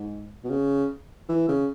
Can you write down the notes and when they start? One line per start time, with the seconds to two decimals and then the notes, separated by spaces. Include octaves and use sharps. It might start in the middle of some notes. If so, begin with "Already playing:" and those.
Already playing: G#2
0.44 B2
0.50 C#3
1.29 E3
1.48 C#3